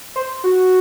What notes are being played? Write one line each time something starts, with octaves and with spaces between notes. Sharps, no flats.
C5
F#4